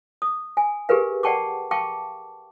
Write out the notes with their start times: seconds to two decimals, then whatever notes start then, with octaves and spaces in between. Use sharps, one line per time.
0.22 D#6
0.57 G#5
0.89 G4 G#4 A#4 B4 F5
1.23 D5 F#5 G5 A5 C#6 D6
1.71 F5 G5 A5 C#6 D6